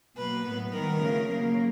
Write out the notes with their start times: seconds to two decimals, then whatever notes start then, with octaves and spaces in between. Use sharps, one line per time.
0.16 B2 F#3 A#3 B4
0.44 A2 F#3 B3
0.72 D#3 G3 B3 A#4
1.00 C#3 F3 A3
1.28 C#3 F#3 A#3